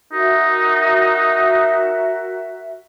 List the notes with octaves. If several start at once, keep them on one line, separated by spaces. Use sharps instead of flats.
D#4 F#4 A#4 E5